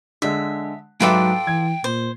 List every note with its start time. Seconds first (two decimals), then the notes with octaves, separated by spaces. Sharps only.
0.22 D3 G#3 E5
1.01 G#2 F#3 F4 A4 B4 D5 E5 G5
1.47 E3 G#6
1.84 A#2 C5